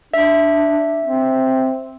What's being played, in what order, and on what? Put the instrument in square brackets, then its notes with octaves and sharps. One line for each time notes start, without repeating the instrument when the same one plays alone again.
[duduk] D4 [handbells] E5
[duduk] C4